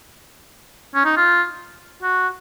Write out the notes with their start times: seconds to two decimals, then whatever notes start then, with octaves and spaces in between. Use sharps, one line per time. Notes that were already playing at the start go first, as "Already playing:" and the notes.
0.95 C#4
1.05 D#4
1.17 F4
2.03 F#4